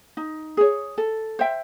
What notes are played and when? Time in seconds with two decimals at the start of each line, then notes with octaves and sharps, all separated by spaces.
0.17 D#4
0.57 G#4 C#5
0.98 A4
1.39 C5 E5 G5